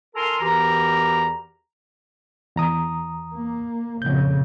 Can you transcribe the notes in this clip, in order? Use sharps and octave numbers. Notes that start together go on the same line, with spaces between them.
F4 A4 A#4 G#5 A#5 C6
E2 E3 F#4 G4 A#4 A#5
E2 A#5 D#6
A#3
F2 A#2 C#3 G6